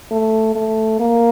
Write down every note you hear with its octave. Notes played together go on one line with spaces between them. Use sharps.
A3
A3
A#3